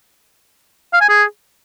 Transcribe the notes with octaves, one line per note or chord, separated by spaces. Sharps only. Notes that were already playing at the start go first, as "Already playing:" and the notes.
F5
G#5
G#4